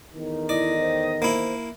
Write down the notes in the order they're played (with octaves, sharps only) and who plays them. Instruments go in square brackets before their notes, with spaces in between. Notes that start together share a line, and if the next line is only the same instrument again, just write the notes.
[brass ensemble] E2 A2 D#3
[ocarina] E4 [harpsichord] D5 [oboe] D#5
[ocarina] C5
[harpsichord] A#3 E4 [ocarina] C5